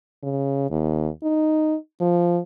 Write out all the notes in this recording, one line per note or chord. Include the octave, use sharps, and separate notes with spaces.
C#3
D#2
D#4
F3